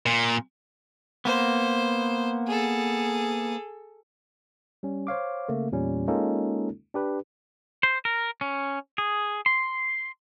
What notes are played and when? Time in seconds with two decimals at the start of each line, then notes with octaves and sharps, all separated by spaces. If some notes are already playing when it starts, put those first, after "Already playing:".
0.06 A#2
1.25 A#3 B3 C5
2.47 G#4 A4
4.83 G3 C#4
5.07 C5 C#5 F5 D6
5.49 C#3 A3 A#3
5.72 E2 A#2 G3 C#4
6.08 G#3 A#3 C#4 D#4 F4 A4
6.94 D4 G4 B4
7.83 C5
8.05 A#4
8.41 C#4
8.98 G#4
9.46 C6